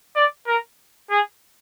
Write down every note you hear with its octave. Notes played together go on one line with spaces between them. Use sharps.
D5
A#4
G#4